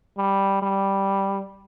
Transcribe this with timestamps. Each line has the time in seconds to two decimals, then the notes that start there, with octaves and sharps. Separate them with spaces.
0.17 G3
0.62 G3